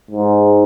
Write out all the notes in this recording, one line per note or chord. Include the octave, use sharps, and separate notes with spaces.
G#2